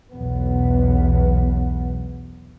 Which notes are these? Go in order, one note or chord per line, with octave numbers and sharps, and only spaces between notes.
B1 E2 B3